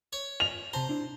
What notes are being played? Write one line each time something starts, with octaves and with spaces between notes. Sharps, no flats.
C#5
F7
C3 C5 A5 A#5
D4 E4